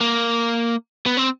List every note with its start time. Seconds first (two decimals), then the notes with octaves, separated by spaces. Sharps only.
0.01 A#3
1.06 B3
1.17 C4